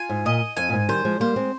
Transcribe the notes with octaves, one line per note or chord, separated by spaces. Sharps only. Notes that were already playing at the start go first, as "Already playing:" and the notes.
Already playing: F4 G#5
G#2
A#2 D#5
F2 G#5
A#2
G#2
D#3 G3 C5
F3 G#3
G3 A#3 C5
G#3 C4